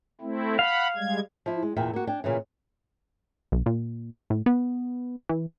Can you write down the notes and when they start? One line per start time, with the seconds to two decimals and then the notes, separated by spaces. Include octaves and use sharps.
0.21 A3 C4 E4
0.59 F5 F#5 B5
0.96 G3 G#3 G#6
1.46 F3 E4
1.62 G#3
1.76 E2 A#2 E5 G5
1.93 A#3 F#4
2.07 D4 G5 G#5
2.24 A#2 C#3 E3
3.52 B1
3.66 A#2
4.30 A2
4.46 B3
5.29 E3